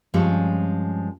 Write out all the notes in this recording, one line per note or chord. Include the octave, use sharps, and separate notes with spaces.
G2 F3 G3 G#3 C4 C#4